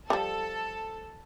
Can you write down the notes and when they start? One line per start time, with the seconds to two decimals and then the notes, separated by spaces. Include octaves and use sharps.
0.10 F3 G3 A4